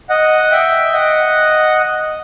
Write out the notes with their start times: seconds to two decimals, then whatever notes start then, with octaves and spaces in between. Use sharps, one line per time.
0.09 D#5 F#5
0.51 E5 G5
0.93 D#5 F#5